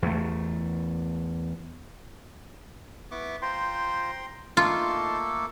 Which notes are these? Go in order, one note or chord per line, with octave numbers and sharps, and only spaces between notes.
E2 A3
B3 E4 C#6 D6
F4 C5 G5 A#5 C6
A3 A#3 D#4 F4 A4 A5 C6